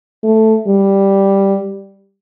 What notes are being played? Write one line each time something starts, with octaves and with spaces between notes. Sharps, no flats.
A3
G3